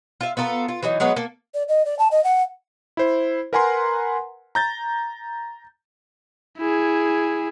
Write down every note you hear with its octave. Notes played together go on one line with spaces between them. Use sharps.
F4 E5
B3 F4 A4 A#4
F4
E3 F#3 D#4
F#3 G#3 B3 C#5
A#3 A4
D5
D#5
D5
A5
D#5
F#5
E4 C5
A#4 B4 F#5 G#5 A#5 C6
A#5 G6 A6
E4 G#4